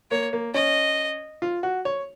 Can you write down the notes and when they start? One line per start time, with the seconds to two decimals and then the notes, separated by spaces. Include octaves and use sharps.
0.11 A#3 C#5
0.33 A#3
0.54 C#4 D#5
1.42 F4
1.63 F#4
1.85 C#5